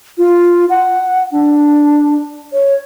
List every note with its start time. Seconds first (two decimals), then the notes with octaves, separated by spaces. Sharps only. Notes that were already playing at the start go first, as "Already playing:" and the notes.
0.18 F4
0.70 F#5
1.32 D4
2.53 C#5